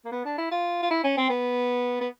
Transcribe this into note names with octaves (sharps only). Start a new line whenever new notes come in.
A#3
B3
D4
E4
F4
F4
E4
C#4
C4
B3
B3